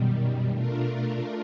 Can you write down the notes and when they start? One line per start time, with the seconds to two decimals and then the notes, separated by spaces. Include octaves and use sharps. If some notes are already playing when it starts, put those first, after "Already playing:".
Already playing: F#2 B2 D#3 G3
0.50 A3 D4 F4 A#4